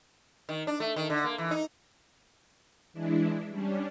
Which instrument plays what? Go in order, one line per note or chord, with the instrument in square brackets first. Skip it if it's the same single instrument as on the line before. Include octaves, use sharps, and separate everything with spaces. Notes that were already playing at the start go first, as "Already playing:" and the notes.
[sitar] D#3
D4
A3
D#3
D3
A#3
E3
D#4
[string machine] E3 G#3 D4 E4
G3 C#4 D4